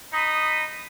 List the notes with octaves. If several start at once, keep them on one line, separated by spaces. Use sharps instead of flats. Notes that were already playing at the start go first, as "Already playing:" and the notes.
D#4 B5 D#6